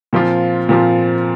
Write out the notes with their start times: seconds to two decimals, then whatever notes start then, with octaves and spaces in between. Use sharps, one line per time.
0.13 A#2 F3 C4 F4
0.69 A#2 F3 C4 F4